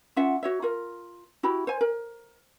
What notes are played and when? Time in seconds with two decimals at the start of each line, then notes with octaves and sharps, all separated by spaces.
0.16 C#4 F4 E5 F#5
0.43 F#4 C#5 E5
0.62 F4 A#4
1.43 E4 F#4 G4 B5
1.67 C5 G#5
1.81 A#4